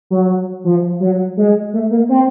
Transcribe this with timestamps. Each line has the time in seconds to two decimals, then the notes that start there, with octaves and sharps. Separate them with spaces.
0.10 F#3
0.64 F3
1.00 F#3
1.37 G#3
1.74 A3
1.91 A#3
2.09 C4